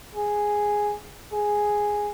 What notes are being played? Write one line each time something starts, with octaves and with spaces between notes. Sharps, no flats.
G#4
G#4